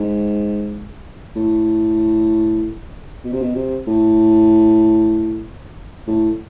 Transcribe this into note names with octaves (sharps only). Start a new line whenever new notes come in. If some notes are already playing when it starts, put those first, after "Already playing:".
Already playing: G#2
A2
B2
C3
B2
C3
A2
A2